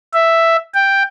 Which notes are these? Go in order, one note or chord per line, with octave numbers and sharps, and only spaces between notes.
E5
G5